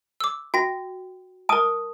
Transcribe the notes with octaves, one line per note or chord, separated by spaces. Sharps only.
D6 E6
F#4 G5 A#6
A#4 A5 D#6 D7